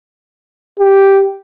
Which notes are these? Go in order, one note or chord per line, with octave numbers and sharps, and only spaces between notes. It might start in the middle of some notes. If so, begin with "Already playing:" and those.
G4